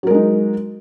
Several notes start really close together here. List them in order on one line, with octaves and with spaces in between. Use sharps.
F#3 A#4 G#3 D#4